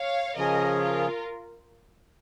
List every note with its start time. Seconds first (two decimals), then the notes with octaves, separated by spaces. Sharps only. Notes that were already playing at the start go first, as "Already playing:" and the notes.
Already playing: C#5 F5
0.37 C#3 F3 C#4 G#4 A#4 D#5
0.81 F4 A#4